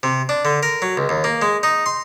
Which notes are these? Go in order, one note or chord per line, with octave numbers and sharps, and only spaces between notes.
C3
D4
D3
A#4
F#3
C#2
D#2
A#3
G#3
D#4
C6